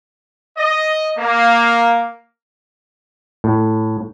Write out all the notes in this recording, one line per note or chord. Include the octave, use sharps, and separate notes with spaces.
D#5
A#3
A2